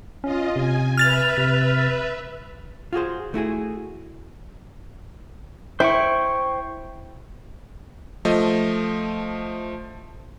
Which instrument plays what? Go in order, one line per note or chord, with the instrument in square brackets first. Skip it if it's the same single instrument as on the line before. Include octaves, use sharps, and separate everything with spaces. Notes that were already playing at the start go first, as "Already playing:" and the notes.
[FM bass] C#4 [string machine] F4 D#5
[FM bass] C3 [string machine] G#5
[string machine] B4 E5 [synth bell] F6 A6 F7
[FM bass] C3
[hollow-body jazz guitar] F4 F#4 G#4 C5
A3 E4 F#4 G#4
[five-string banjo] E4 [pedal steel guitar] C5 G5 C#6
[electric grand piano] F3 A3 D#5